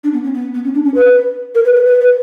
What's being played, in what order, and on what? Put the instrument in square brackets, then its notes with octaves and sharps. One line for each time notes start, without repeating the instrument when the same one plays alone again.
[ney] D4
B3
C#4
B3
B3
C#4
D4
C#4
B4
A#4
B4
B4
B4
B4